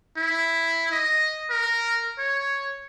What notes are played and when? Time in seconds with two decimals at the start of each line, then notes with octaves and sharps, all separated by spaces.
0.17 E4
0.91 D#5
1.50 A#4
2.19 C#5